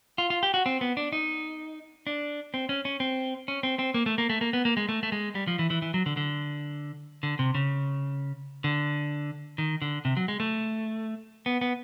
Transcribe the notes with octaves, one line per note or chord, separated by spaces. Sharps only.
F4
F4
G4
F#4
C4
B3
D4
D#4
D4
C4
C#4
C#4
C4
C#4
C4
C4
A#3
A3
A#3
A3
A#3
B3
A#3
G#3
A3
A3
G#3
G3
F3
E3
E3
E3
F#3
D3
D3
D3
C3
C#3
D3
D#3
D3
C3
F#3
G#3
A3
B3
B3